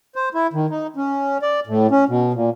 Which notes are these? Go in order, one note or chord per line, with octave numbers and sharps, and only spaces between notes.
C5
E4
D#3
D#4
C#4
D5
A2
C#4
B2
A#2